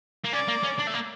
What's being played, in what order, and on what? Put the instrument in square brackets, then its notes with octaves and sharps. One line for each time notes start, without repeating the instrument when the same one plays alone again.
[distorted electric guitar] A#3
[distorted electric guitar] C#4 [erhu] D5
[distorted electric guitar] A#3
C#4
D4
A3
A#3